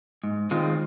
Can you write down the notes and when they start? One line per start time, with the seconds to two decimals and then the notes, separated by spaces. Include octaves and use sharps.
0.24 G#2
0.51 D#3 G#3 C4 F4